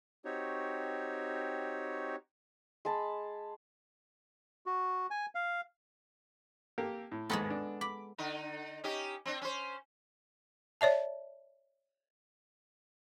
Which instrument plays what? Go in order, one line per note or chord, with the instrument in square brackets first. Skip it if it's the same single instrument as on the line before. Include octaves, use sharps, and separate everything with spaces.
[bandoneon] C4 D#4 F#4 G4 C#5
[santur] G#3 A5 B5
[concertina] F#4
G#5
F5
[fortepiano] A#3 G4 A4
A2
[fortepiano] D#2 G#2 D#6 [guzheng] G#3 B3 A4
[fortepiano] D4
[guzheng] B5 [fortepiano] D6
[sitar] D3 D#4
C#4 D#4 G4
C4 D4
C#4 C5
[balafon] C#5 D5 E5 A5